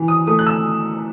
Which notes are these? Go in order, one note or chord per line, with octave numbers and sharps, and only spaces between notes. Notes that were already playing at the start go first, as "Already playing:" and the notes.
Already playing: E3
D#6
A3 D#6
F#6
E6